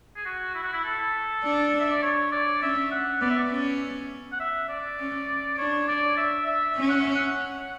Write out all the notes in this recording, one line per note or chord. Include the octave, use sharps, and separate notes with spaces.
G#4
F#4
E4
F#4
E4
A4
D4
E5
D5
C#5
D5
C#4 E5
F#5
B3 D5
E5
D5
C#4
F#5
E5
D5
C#4
D4 C#5
D5
E5
E5
C#4
F#5
E5
F#5